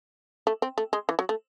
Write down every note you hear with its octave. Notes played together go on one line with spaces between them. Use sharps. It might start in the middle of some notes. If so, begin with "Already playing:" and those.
A3
C4
A3
G#3
E3
F#3
A3